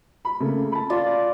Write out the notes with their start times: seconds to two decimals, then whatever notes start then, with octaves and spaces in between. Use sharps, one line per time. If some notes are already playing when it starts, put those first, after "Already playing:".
0.25 B5
0.40 C#3 A3 A#3
0.72 A5 B5
0.90 F4 D5